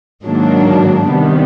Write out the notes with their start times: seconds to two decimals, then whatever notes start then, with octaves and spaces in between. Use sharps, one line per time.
0.24 G#2 D#3 F#3 A#3 D4
1.09 C3 D#3 G3 B3